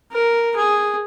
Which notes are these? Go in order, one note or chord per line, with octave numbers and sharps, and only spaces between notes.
A#4
G#4